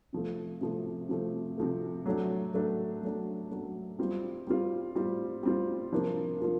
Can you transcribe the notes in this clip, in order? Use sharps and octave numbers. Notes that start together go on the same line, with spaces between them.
C3 F3 A3
C3 F3 A3
C3 F3 A3
C3 F3 A3
F#3 A3 D4
F#3 A3 D4
F#3 A3 D4
F#3 A3 D4
G3 C4 F4
G3 C4 F4
G3 C4 F4
G3 C4 F4
C3 F3 A#3 D4 F4
C3 F3 A#3 D4 F4